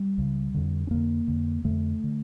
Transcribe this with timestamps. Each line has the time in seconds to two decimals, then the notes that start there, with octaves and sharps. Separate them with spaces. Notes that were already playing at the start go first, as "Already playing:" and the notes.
Already playing: G3
0.18 C#2 C#3
0.54 F2 D3
0.87 C#4
0.90 F2 D3 A#3
1.27 F2 D3
1.64 F2 D3 A3
2.04 D3